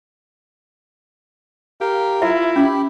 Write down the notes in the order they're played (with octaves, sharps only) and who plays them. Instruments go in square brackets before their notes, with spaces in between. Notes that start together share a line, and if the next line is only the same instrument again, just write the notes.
[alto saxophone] G4 [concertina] A#4 F5
[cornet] E4 [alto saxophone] F4 [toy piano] E5
[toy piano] C#4 [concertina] G4 B5